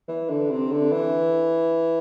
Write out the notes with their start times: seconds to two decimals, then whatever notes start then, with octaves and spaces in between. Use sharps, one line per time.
0.08 E3
0.29 D3
0.50 C3
0.72 D3
0.92 E3